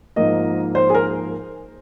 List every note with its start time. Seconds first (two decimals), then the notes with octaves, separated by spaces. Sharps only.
0.16 G#2 F3 A#3 D#5
0.75 C5
0.90 G#4
0.94 A#4